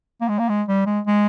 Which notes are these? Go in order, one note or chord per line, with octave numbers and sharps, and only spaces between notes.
A#3
G#3
A#3
G#3
G3
G#3
G#3